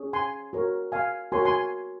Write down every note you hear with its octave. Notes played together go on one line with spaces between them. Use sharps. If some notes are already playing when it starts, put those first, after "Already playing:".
Already playing: C#4 G#4
G#5 C6
F#4 A#4 C#5
F5 G#5
F#4 A#4 C#5 G#5 C6
G#5 C6